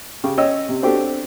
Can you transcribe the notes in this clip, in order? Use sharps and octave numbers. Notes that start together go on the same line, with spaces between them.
C#3 G4
C#4 C#5 D#5 G5 E6
C3
C4 D4 F#4 G4 A4